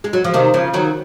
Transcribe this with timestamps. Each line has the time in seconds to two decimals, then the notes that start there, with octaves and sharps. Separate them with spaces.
0.04 G#3
0.13 F#3
0.24 F3
0.34 C3 D#3
0.54 C#3 F3
0.73 D#3 F#3